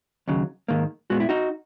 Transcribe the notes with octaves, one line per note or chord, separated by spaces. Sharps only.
D#2 C#3 F#3
G#2 D#3 A#3
A#2 G#3 B3 F#4
E4
D#4 F#4